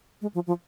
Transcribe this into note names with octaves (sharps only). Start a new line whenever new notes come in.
G#3
F3
F3